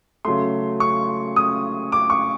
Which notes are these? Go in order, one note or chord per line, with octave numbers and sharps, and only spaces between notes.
C#3 F#3 A3 C6
C#6
D#6
D6
C#6